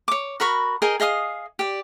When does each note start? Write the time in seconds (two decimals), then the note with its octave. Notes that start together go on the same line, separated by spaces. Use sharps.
0.08 C#5 D6
0.40 F#4 A#4 B5 C#6
0.82 G#4 A#4 D#5 G5
1.00 G#4 D#5 F5 D#6
1.59 G4 D5